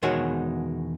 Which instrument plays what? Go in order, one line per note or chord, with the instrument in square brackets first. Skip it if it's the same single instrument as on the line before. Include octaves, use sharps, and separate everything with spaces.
[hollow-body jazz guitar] E2 B2 D#3 G#3 F#4 C#5